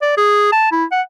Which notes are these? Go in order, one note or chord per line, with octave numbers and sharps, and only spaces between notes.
D5
G#4
A5
E4
F#5